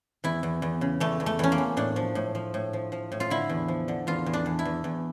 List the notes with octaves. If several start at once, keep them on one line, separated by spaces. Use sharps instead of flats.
E2 E4
E2
E2
C#3
E2 A3
E2
A3
E2 C#4
A#3
E2
A2 D4
F3
A2
F3
A2
F3
F3
A2
F4
D3 E4
E2
F3
D3
E2 F4
E2
D4
E2
E4
E2
E2